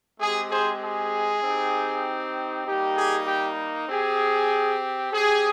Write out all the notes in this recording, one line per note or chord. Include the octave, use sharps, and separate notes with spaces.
G#3 C4 G4 G#4
G#4 C5
G#4
C4 D#4 G4
G3 A#3 D#4 G4
G#4
G4
C4 G4 G#4
C4 G4 G#4